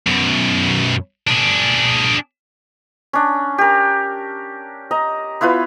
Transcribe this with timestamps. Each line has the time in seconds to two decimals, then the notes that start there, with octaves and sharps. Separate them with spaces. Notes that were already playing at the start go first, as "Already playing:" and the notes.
0.07 F#2 B2
1.27 D4 G#4
3.13 C#4 D4
3.58 G4 A#4
4.91 D#5 A#5
5.41 B3 E4 F4 B4